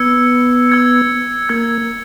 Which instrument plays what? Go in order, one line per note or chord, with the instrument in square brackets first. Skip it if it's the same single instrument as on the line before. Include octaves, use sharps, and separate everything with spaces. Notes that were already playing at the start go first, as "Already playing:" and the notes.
Already playing: [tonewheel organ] B3 [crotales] E6 G#6 C#7
[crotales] E6 G#6 C#7
[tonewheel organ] A#3 [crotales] E6 G#6 C#7